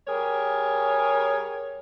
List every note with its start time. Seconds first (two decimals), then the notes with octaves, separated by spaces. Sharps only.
0.07 G3 G#4 A#4 C#5